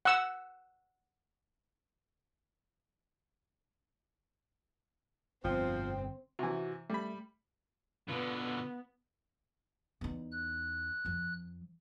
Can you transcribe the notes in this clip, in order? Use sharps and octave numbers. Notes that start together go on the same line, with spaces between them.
F#5 E6
G1 F2 B2 F3 C4 G5
C3 E3 F#4
G3 A3 B5
B2 D3 B3 F4 B4
E2 D#4
F#6
F2 F3